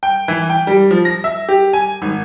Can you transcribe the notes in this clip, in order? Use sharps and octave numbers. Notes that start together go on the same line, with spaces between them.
G5
E3
G5
G3
F3
A#6
E5
G4
G#5
G#1